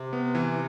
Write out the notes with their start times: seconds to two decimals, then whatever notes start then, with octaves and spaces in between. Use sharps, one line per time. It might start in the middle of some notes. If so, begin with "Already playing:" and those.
Already playing: C3
0.13 B3
0.35 E3